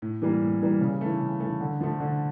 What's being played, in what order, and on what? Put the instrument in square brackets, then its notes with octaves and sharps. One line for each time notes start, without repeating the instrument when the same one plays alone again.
[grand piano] A2
E3 G3 A#3
A2
E3 G3 A#3
C#3
E3 A3
C#3
E3 A3
D3
F3 A3
D3